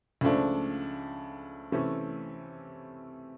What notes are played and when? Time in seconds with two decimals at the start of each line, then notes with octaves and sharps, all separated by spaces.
0.21 C#2 C#3 F3 A3 D4
1.72 C3 E3 A3 C#4